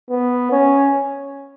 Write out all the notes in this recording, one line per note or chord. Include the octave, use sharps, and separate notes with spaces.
B3
C#4